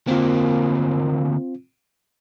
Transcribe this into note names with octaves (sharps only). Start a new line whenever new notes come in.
D2 A#3 C4 F4